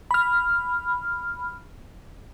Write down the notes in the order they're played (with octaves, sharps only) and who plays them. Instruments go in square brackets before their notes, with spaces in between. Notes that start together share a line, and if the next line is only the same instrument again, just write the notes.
[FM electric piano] B5 F6